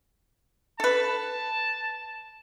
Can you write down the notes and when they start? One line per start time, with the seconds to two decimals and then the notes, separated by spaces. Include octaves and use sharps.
0.80 A4 B4 A5